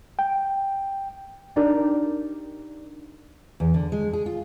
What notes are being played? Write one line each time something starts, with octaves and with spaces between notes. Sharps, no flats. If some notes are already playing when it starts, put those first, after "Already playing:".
G5
D4 D#4 G4 A#4 D5
E2
D3
G#3
G#4
F4